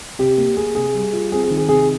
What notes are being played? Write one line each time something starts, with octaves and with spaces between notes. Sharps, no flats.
C3 G4
A#3
A#3 G#4
C3 G#4
G3
F4
C4 G#4
G#4
D#3
G#4
C3 G#4